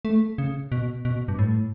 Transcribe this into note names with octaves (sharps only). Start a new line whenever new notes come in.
A3
C#3
B2
B2
G2
A2